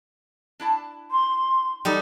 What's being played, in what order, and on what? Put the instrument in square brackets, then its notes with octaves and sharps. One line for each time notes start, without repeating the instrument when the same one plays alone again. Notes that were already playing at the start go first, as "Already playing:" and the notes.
[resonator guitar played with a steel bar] D4 E4 A5
[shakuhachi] C6
[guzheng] G3 D#4 A4